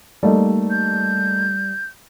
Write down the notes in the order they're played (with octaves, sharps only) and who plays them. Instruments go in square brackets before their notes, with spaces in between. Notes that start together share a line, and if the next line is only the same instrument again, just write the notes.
[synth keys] G3 [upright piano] A3 A#3 D#4
[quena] G6